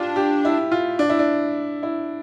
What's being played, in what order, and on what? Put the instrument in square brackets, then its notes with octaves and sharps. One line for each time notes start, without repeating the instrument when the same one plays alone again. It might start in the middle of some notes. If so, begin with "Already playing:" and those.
Already playing: [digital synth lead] D4 [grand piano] F4 G4
[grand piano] G4
E4
F4
D4
E4
D4
E4